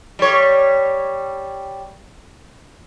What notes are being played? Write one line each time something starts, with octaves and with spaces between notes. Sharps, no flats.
G3 C#5